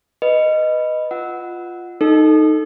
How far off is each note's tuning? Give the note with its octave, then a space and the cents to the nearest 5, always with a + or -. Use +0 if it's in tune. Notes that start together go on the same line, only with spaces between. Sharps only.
B4 +0 D#5 +0
F4 +0 F#5 +0 E6 -20
D#4 +0 A4 +0